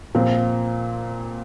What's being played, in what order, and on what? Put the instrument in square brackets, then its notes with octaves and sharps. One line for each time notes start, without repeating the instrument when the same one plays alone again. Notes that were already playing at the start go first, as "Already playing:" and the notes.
[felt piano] A#2 F3 C4